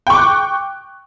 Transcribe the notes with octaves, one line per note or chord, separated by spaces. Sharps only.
G5 C#6 D6 F#6